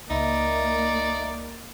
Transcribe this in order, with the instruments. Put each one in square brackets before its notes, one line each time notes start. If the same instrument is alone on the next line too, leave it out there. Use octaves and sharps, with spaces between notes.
[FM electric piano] C#2 E5 B5 [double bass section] A#3 [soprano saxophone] D#4 [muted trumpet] D5